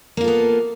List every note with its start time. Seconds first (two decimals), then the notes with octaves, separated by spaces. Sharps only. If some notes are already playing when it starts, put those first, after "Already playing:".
0.17 A#3
0.21 F4
0.24 A4
0.28 B3